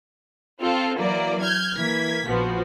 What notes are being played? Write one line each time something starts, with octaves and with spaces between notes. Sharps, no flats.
C4 F4 A4
E3 F#3 A#3 A#4 D5
F6 G6 G#6
E3 A#3 G#6 B6
A#1 F3 B3 F#4